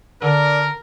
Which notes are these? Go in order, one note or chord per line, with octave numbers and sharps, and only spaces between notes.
D3 D4 A#4